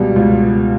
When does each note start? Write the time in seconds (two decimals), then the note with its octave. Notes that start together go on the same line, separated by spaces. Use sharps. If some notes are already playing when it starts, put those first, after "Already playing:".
Already playing: C#2 B2 G3
0.16 C#2